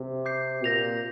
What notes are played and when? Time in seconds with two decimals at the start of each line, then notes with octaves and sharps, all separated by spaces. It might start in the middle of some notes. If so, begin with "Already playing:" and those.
Already playing: C3
0.25 D6 G6 C7
0.64 A#2 G6 A#6 F7